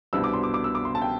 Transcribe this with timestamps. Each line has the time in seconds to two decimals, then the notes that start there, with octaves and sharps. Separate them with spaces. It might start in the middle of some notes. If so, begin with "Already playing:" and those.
0.13 C2 B2 B3 D4 E6
0.24 D6
0.33 C6
0.43 D6
0.54 D6
0.64 E6
0.75 D6
0.85 C6
0.95 A5
1.02 G5